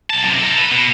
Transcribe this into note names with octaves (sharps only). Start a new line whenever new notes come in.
B1 A5
F#2 C3
D#4 A4
B4
B2